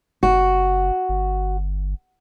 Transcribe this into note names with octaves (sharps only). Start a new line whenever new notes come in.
F#1 F#4
G1